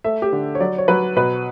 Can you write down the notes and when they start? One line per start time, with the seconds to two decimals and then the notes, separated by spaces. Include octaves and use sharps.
0.04 A3 E5
0.22 G4
0.33 D3
0.55 C#5
0.60 F#3 D5
0.78 C#5
0.88 F#3 B4
1.16 B2 B4